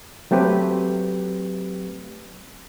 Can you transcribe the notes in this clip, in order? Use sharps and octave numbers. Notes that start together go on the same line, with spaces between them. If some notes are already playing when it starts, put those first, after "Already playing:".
F#3 A3 C4 G4 B4